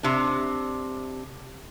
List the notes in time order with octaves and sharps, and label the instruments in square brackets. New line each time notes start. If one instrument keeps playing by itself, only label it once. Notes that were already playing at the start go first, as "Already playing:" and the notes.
[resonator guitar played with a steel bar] C3 D4